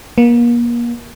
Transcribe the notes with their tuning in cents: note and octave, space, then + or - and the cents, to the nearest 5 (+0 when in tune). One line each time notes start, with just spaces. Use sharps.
A#3 +35